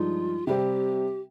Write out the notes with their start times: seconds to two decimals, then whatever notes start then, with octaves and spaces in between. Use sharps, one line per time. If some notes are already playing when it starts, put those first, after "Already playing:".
Already playing: G2 F3 G#3 D#4 F4
0.47 C3 G3 C4 G4